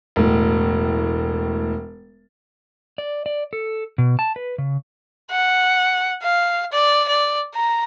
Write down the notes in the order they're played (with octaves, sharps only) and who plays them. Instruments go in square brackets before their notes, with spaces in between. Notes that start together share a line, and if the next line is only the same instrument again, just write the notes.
[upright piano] E1 A2
[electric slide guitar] D5
D5
A4
B2
A5
B4
C#3
[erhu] F#5
F5
D5
D5
A#5